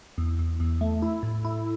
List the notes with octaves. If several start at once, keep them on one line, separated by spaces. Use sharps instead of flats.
E2
E2
E2
A3
E4
A2
E4